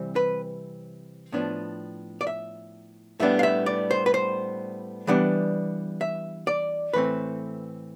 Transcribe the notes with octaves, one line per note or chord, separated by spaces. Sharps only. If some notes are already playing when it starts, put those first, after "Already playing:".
Already playing: C3 E3 G3 C4
B4
A2 F3 B3 D4
D5
E5
A2 G3 B3 D4 E5
F5
E5
D5
C5
B4
C5
E3 G3 B3 D4
E5
D5
A2 E3 A3 C4 B4